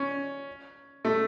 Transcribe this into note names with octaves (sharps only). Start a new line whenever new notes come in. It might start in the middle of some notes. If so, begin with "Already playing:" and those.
Already playing: C#4
A3